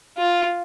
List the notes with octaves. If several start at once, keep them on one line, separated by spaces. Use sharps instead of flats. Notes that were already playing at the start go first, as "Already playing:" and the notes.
F4